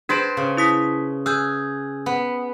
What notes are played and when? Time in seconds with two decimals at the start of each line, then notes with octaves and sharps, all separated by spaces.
0.09 D4 G#4 B4 C5 A5 D7
0.37 C#3
0.57 E4 D#6 B6
1.26 G#4 E6 F#6 G6
2.06 B3